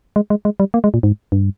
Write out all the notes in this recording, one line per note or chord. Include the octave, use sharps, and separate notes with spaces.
G#3
G#3
G#3
G3
A#3
G#3
A#2
G#2
G2